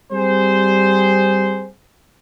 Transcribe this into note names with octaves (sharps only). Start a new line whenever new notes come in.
G3 C4 G#4 C5